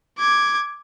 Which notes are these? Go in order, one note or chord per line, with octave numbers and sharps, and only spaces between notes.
D6 G#6